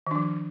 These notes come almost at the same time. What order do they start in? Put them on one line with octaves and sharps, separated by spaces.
D#3 D4 F3